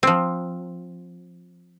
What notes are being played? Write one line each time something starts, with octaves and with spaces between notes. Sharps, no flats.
F3 C4